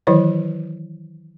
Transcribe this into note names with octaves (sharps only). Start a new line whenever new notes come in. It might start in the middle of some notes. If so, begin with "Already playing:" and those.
D#3 E3 F#3 E4 C5 C#5